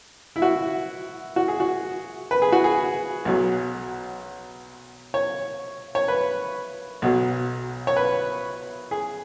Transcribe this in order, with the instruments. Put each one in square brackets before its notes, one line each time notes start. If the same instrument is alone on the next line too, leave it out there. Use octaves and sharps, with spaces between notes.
[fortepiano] E4
F#4
F#4
G#4
F#4
B4
G#4
F#4
G#4
B1 B2 F#3
C#5
C#5
B4
B1 B2 F#3
C#5
B4
G#4